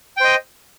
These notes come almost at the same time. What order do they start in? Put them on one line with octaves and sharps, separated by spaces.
G5 C5 D#5